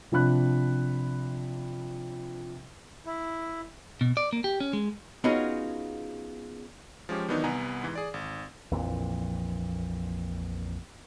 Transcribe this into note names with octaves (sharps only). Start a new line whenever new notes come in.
C3 F3 D4 B5 F#6
E4
B2
D5
A#3
G4
C#4
G#3
B3 C#4 D#4 F4 F#4 G#4
F3 G#3 C#4 G4
D#3 E3 F#3 B3 D4 D#4
C2 B3 G#5 A#5
G#2 E3
G#4 D5
G#1
A#1 F2 A#2 E3